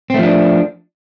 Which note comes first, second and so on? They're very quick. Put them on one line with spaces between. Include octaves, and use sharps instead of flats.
C4 A3 F3 D4